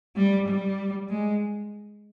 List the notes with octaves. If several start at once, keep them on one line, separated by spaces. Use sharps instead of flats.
G3
G3
G#3